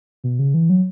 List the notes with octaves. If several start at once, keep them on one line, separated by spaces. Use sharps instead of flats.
B2
C#3
E3
F#3